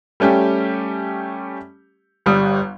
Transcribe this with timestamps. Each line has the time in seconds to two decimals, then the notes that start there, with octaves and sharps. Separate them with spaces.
0.20 G3 A3 C#4 G4
2.26 G1 G3 D#6